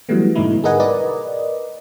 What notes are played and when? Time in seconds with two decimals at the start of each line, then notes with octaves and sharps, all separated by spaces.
0.09 E3 F#3 G3 A3 B3
0.35 G#2 B2 D3 A3 D#4 E4
0.64 G#4 A#4 B4 D#5 F#5 G#5
0.80 A#4 B4 D5 D#5